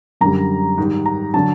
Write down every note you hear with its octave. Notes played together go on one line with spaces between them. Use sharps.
F#2 D3 G3 A#5
G#2 D#3 G3
A#5
D3 F#3 A5